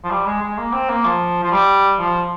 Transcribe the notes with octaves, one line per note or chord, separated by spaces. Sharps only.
F3
G3
G#3
G#3
A#3
C4
A#3
F3
F3
G3
F3